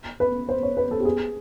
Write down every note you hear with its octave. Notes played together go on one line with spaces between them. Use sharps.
B4
C5
C#5
B4
A4
G4
G#4